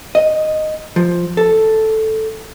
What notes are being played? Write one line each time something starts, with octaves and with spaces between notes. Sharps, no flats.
D#5
F3
A4